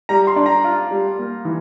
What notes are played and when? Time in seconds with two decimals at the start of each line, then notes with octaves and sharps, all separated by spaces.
0.09 G3 A#5
0.27 C6
0.36 D4
0.46 A#5
0.64 F4
0.91 G3
1.19 A#3
1.45 E3